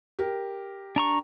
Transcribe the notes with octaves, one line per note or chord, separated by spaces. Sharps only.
G4 A#4
D4 A#5 C#6